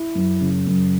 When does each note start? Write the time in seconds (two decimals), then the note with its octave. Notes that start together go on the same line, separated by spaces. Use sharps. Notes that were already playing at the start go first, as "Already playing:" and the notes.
Already playing: E4
0.15 F#2
0.41 C#3
0.67 F#2